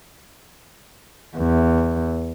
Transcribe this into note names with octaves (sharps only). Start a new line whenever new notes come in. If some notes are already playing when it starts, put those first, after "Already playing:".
E2